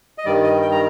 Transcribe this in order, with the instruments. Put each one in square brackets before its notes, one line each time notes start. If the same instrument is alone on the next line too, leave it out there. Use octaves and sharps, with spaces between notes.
[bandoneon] D#5
G2 D#3 G3 D5
D#5
G5
A#5